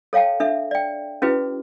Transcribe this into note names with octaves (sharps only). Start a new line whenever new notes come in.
A4 C#5 F5 G5 A5
D4 A4 E5
D5 G5
C#4 E4 F#4 G#4 B4